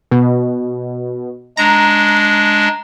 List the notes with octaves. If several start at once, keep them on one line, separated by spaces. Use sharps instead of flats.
B2
G#3 D4 A#5